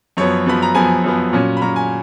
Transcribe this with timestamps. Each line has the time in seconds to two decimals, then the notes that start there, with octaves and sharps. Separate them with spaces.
0.17 F#2 F3 B3 C#5
0.46 F#2 F3 B3 B5
0.62 A#5
0.75 F#2 F3 B3 G#5
1.04 F#2 F3 B3
1.33 A#2 F#3 C#4
1.57 B5
1.62 A#2 F#3 C#4 A#5
1.76 G#5